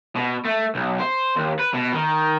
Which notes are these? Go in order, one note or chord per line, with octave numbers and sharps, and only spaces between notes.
B2
A3
B1
C5
D#2
B4
B2
D#3